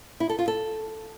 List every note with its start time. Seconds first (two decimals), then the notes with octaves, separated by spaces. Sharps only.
0.20 E4
0.29 A4
0.39 F4
0.48 A4